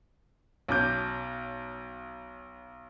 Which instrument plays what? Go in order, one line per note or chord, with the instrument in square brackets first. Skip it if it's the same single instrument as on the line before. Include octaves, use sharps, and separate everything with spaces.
[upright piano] B1 C#4 D6 G6